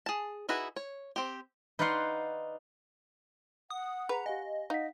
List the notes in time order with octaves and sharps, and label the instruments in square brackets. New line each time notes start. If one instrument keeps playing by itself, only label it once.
[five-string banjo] G#4 A5
D#4 E4 F#4 G#4 B4
C#5
C4 G4
[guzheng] D#4 B4 D5 F5 F#5 C6
[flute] F#5 [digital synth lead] D#6
[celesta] G#4 B6 [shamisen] B4 [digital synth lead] A#5
[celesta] G4 F5 G#5 [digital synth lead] D#5
[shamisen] D#4 [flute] D#5 [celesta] F5 F#5 B6